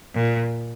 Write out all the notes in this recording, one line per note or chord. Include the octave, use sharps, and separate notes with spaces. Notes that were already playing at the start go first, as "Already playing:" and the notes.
A#2